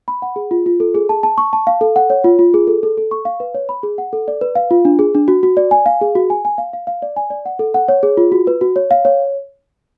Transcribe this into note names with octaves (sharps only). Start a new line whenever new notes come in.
B5
F#5
G#4
F4
F4
A4
G#4
A5
A5
C#6
A5
F5
A4
F#5
C#5
F4
F4
G#4
A4
A4
A4
C#6
F5
B4
C#5
B5
G#4
F#5
A4
D5
B4
F5
F4
D4
G#4
D4
F#4
F#4
D5
G#5
F5
G#4
F#4
G#5
G#5
F5
F5
F5
D5
G#5
D5
F#5
A4
F#5
C#5
G#4
F4
F#4
B4
F#4
C#5
F5
C#5